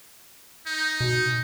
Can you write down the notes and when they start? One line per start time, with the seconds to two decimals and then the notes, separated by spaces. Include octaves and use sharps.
0.66 D#4
1.00 B2